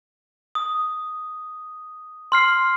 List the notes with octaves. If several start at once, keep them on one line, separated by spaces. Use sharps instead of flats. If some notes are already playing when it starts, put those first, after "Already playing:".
D#6
C6 F6 C7